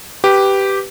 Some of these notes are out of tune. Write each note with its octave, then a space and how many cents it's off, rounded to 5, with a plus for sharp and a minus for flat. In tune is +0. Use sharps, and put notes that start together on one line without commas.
G4 -5 B4 +5